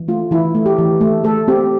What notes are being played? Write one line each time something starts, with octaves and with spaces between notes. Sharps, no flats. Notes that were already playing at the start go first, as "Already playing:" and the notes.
Already playing: E3
A3 F4
E3 E4
A3
G4
E3
A3
A3 A4
C4 G4